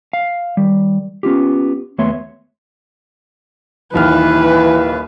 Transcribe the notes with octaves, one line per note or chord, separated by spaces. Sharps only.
F5
D#3 G3
B3 C#4 F4 G4
D#2 A3 B3 C#5 E5 C6
D#1 D#2 E3 B4 F6